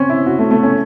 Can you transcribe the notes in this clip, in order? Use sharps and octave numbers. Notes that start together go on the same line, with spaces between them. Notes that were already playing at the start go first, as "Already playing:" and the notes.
Already playing: C4 C#4
E4
F#4
A3
A3
C#4